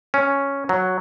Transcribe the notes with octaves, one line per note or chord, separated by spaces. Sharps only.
C#4
F#3